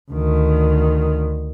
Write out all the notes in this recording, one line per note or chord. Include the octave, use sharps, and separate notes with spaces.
D2 D#3